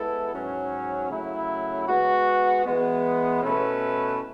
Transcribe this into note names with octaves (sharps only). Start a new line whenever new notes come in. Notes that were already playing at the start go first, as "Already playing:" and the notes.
Already playing: G#3 B3 E4 A4
G#2 F#3 C#4
C#3 F#3 A3 E4
G#3 B3 F#4
E3 G#3 B3
B2 A3 C#4 E4 B4